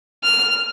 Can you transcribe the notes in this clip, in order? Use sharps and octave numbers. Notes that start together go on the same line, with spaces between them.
F6